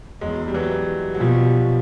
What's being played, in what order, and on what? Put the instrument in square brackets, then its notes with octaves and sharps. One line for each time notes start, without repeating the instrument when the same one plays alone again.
[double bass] E2 [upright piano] F#3 G#3
[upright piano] G3
E3 F#3
F#3
[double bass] B2 [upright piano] F3 G3